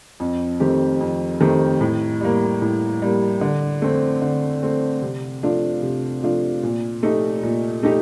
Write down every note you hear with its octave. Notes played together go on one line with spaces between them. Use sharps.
F2
D#3 A3 C4 G4
F2
D#3 A3 C4 G4
A2
G3 A#3
A2
G3 A#3
D3
A3 C4
D3
A3 C4
C3
F3 A3 D4 F4
C3
F3 A3 D4 F4
A#2
A3 D#4 G4
A#2
A3 D#4 G4